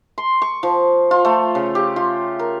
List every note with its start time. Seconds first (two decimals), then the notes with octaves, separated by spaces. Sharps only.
0.18 C6
0.42 C#6
0.63 F3
1.11 F4
1.25 A3
1.55 C#3
1.75 G4
1.96 F4
2.39 A#4